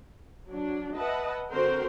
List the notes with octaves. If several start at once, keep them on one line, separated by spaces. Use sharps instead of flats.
F#3 D4
B4 D#5 E5 F#5 A5
D3 C4 F#4 A#4 C5 G5